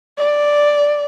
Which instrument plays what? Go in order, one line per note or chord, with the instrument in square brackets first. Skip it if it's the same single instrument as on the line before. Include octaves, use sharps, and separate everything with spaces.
[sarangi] D5